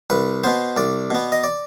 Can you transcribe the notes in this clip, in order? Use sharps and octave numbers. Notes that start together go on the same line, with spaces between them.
C2 B4
B2 B3 C5
C2 D5
B2 B3
D#5
D5